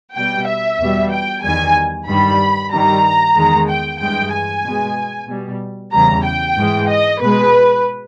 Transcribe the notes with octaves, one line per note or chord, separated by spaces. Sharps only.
B2 G3 G5
E5
E2 B2 G3
G5
E2 D#3 G3 G#5
G2 D#3 G3 B5
G2 D#3 G3 A#5
E2 D#3 G#3
G5
G2 E3 G#3 G5
G#5
B2 G#3
B2 G3
E2 C#3 E3 G3 A#5
G5
G#2 E3 G#3
D#5
B2 G#3 B4